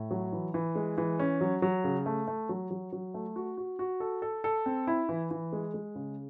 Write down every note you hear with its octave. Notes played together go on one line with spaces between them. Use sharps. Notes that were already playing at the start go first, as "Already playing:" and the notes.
Already playing: A2
F#3
E3
E3
G#3
E3
C#4
F#3
F#3
C#3
A3
A3
F#3
F#3
F#3
A3
F#4
F#4
F#4
A4
A4
A4
C4
E4
E3
E3
G#3
G#3
C#3